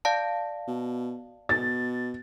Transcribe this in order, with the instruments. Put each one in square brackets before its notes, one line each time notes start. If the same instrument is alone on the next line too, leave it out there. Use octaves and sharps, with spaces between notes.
[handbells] D5 F5 A5
[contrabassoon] B2
[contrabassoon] B2 [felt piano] A6